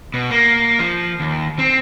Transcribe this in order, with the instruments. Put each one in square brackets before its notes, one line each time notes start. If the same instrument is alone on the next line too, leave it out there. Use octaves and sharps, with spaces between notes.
[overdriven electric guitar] B2
A#3
F3
D#2
C4